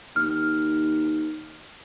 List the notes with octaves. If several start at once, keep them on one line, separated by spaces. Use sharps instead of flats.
D#2 F6